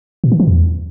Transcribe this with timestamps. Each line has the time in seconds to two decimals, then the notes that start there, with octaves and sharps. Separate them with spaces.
0.24 A#2
0.32 D#3
0.40 E3
0.48 E2